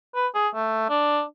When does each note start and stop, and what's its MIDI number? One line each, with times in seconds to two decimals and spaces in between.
0.15 0.27 71
0.35 0.48 68
0.55 0.87 57
0.89 1.23 62